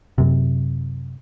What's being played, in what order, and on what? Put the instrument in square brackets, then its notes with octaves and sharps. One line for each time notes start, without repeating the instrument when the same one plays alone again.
[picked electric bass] F#2 C3